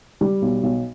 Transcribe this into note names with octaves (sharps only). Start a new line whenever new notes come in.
G3
B1
B1